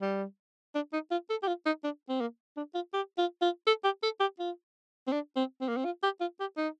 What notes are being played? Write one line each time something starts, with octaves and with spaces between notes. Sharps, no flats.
G3
D4
D#4
F4
A4
G4
F4
D#4
D4
C4
A#3
D4
F4
G4
F4
F4
A4
G4
A4
G4
F4
C4
D4
C4
C4
A#3
C4
F4
G4
F4
G4
D#4